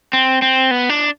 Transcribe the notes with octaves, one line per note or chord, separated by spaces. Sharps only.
C4
C4
B3
D4